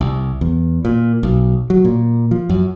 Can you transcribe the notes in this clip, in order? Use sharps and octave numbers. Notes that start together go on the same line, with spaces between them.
C2
E2
A#2
B1
F#3
A#2
F3
F#2